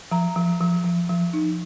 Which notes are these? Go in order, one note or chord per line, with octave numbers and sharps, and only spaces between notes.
F3 A#5
F3
F3
F3
F3
D#4